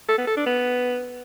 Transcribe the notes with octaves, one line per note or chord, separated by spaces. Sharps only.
A4
B3
A4
D4
B3